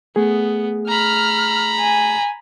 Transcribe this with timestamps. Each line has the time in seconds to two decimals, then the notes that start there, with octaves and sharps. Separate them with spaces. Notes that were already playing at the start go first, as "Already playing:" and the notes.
0.16 A3 B3 G#4
0.89 A#5 B5 F6
1.80 G#5